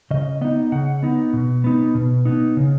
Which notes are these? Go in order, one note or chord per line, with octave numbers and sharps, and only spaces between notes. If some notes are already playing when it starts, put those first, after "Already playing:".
C#3 D#5
B3 D#4 D#5
C#3 F#5
B3 D#4
B2
B3 D#4
B2
B3 D#4
C#3